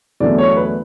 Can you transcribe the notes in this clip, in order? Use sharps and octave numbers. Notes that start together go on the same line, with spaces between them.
E2 D3 F#3 A3 D5
C#5
B4